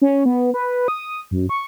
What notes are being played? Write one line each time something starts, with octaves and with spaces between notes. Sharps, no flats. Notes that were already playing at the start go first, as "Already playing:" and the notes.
C#4
B3
B4
D#6
F#2
C#6